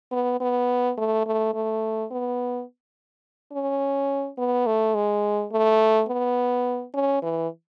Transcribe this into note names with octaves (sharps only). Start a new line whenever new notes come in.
B3
B3
A3
A3
A3
B3
C#4
B3
A3
G#3
A3
B3
C#4
E3